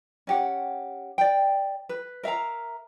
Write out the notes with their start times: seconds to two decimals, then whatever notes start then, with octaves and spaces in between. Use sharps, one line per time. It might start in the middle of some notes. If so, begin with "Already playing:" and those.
0.27 C#4 G4 F#5
1.18 D5 G5
1.89 B4
2.23 A#4 E5 F5 A#5